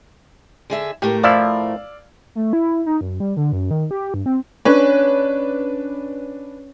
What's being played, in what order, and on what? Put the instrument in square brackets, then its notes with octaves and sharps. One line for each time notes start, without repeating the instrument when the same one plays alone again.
[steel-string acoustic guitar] D3 G#4 E5
[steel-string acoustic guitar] A2 A3 A#4 [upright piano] G4
[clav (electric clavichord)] F3 E4 [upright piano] D5 F5 E6
[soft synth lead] A3
E4
D#4
F#2
G3
D3
F#2
D#3
G4
G2
C4
[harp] C#4 [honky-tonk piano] D4 B4